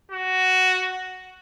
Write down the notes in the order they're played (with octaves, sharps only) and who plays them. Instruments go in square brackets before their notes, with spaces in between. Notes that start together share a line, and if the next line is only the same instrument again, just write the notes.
[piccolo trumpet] F#4